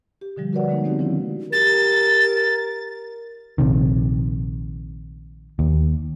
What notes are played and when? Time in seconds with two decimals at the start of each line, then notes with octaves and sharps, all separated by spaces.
0.21 G4
0.37 B2 D3 F3 G3
0.53 F#4 A#4 B4 C#5 D5 F#5
0.68 D3 G#3 A#3 D#4
0.84 A3 B3 C4 D#4 F#4 G4
0.99 D#3 F3 G#3 C#4 E4
1.53 G4 A#4 A6
3.58 A#1 C3 D#3
5.59 D#2